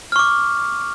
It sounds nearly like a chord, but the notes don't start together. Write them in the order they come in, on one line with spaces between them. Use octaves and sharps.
F6 C#6 D6